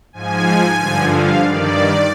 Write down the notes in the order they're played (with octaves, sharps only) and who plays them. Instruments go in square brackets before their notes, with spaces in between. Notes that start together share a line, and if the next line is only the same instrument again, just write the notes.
[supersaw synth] G#2 F3 G#5
G2 D3 F3
F5
G2 D#3 D5